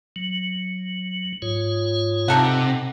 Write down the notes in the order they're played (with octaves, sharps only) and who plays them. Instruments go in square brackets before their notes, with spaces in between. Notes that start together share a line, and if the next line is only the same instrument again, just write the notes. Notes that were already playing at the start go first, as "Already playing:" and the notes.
[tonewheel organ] F#3
G#2 F4 C#5
[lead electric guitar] C3 [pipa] D#4 A4 F#5